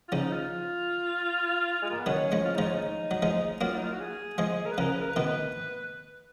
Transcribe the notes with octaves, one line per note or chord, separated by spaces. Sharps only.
F4
C#3 F3 D#4
F4
G#3
A#3
B3
D#3 F#3 C#4
F3 G#3
F4
F3 G#3 D#4
C#4
D#4
F#3
F3 G#3
F#3 A#3 F4
D#4
F4
F#4
G#4
F3 G#3 G#4
A#4
B4
C#3 F3 A#4
B4
A#4
B4
B2 D#3